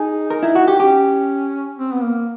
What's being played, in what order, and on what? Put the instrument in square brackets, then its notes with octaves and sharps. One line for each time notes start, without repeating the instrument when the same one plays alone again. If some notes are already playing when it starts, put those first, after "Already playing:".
Already playing: [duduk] D#4 [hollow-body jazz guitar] G#4
[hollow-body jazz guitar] A#4
E4
F#4
G4
[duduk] C#4 [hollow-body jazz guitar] G4
[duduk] C4
B3
A#3